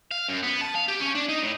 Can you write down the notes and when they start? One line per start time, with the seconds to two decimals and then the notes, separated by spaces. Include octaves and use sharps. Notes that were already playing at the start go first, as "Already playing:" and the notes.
0.11 F5
0.28 F#2
0.43 B3
0.61 A5
0.75 F5
0.88 G4
1.00 C#4
1.15 D4
1.29 D#4
1.42 A2